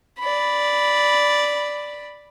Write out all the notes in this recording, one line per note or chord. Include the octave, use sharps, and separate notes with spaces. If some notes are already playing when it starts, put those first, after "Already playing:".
D5 B5